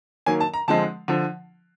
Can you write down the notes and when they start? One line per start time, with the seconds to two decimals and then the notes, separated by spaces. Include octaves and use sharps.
0.26 D#3 F#3 A#3 G#5
0.40 A5
0.54 A#5
0.68 D3 F3 G#3 C4 A5
1.08 D3 F3